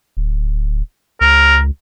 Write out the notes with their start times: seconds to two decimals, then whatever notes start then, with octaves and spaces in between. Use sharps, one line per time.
0.17 D1
1.21 C#2 A#4